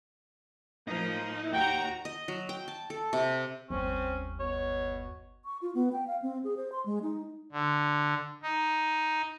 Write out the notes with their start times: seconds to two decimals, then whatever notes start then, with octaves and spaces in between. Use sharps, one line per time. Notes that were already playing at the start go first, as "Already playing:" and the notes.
0.88 A2 F3 A#3 D#4
1.53 D#2 F#4 G5 A#5
2.05 D#5
2.28 F#3
2.49 G5
2.68 A5
2.90 A4
3.13 C3
3.70 G1 D#2 C4 C#4
4.40 B2 C#5
5.45 C#6
5.62 F4
5.75 B3
5.92 G5
6.07 F5
6.22 C4
6.44 G#4
6.57 C5
6.72 C6
6.86 G#3
7.03 D#4
7.52 D3
8.42 D#4